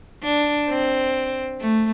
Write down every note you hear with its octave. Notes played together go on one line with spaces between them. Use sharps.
D4
C4
A3